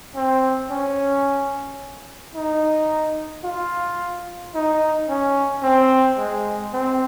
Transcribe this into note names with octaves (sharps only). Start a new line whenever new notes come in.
C4
C#4
D#4
F4
D#4
C#4
C4
G#3
C4